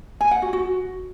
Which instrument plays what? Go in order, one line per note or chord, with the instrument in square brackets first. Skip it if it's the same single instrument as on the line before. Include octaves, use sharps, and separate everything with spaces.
[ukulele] G#5
F#5
F#4
F#4